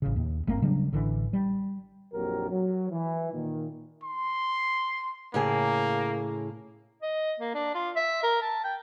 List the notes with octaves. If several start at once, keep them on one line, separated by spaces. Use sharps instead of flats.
A1 C#3
D#2
G1 A3 A#3 C4
C#3 F#3 G3 D4
A1 D3 E3
G3
A#1 F2 F#3 G4 A#4
F#3
E3
A#2 D#3
C6
A2 C#3 A#3 G#4
D#5
A#3
D4
F4
E5
A#4
A5
G5